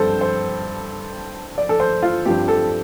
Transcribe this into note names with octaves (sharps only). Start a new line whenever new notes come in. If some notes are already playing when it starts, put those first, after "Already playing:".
Already playing: G2 G3 C4 A4 C5
C5
D5
A4
C5
F4
G2 F3 C4 G4
A4